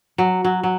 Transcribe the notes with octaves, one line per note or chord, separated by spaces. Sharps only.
F#3
F#3
F#3